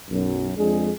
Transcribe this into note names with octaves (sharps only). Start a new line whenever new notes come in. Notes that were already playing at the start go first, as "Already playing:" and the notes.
B1 F#2
F2 G#3 D4 G#4